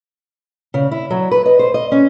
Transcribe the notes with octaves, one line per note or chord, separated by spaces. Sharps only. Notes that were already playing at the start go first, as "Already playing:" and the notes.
C#3
E4
F#3
B4
D#5
C5
D#5
C#4